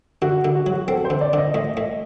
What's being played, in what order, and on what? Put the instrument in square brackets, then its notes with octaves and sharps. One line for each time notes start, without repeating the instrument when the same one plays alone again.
[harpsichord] D3 [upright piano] F#4
[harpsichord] D3
[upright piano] F#4
[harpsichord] F#3
[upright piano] F#4
[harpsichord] C4 [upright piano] A4
[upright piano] C5
[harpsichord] D3
[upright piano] D5
[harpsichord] D3 [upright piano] D#5
[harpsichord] A2 [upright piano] D#5
[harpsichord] A2